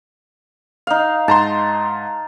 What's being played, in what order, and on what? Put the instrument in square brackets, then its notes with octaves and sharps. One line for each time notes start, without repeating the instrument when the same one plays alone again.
[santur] D#4 F5
[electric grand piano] G#2 A#5 C6 [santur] A5